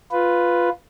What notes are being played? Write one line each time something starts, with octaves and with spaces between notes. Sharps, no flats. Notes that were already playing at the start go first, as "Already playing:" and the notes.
F4 B4